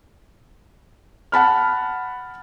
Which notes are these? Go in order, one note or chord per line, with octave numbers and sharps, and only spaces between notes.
F#5 A5 B5 F6